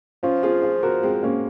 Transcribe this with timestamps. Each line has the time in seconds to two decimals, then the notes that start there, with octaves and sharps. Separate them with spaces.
0.23 F3 C#4 F4
0.43 F4 G#4
0.63 F4 G#4
0.83 F#4 A#4
1.03 G#3 C4
1.23 A#3 C#4